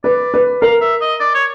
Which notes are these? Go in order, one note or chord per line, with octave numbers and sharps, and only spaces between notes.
B4 D5
B4
A#4 F5
E5
D#5
D5
C#5